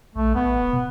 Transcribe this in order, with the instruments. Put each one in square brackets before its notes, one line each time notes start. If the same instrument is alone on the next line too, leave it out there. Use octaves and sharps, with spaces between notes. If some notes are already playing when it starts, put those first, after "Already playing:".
[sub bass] A#1 [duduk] A3
[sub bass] A1 [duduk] B3
[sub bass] D1
B2